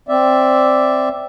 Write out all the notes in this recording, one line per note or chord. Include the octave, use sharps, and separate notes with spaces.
C4 D5 E5